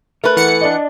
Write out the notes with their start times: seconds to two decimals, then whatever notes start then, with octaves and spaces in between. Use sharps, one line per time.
0.24 A3 A#4 B4
0.36 E3 F#5 C#7
0.61 D4 D5 D#5